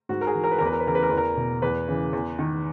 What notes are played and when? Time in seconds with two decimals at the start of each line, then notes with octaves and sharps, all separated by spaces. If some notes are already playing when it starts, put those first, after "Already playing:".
0.09 G#2 F#4
0.21 A#4
0.27 G#4
0.35 E3
0.44 A#4
0.51 B4
0.58 E2 A#4
0.66 B4
0.73 A#4
0.80 B4
0.86 C#3 E3 A#4
0.95 B4
1.03 A#4
1.09 E2 B4
1.17 A#4
1.37 B2
1.62 E2 B4
1.88 C#3 E3
2.13 E2
2.39 D#3